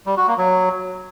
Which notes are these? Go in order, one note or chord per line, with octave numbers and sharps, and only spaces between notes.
G3
F#4
A#3
F#3